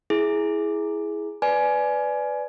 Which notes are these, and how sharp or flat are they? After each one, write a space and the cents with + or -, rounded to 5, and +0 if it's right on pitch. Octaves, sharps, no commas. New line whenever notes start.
E4 -5 G#4 +10
B4 +15 D5 +0 G#5 +20